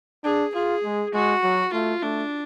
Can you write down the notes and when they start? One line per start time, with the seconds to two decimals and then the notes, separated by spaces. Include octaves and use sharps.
0.24 D4 G#4
0.54 F4 G#4
0.84 G#3
1.14 G#3 F#4
1.44 F#3
1.73 A3 F4
2.02 A3 D4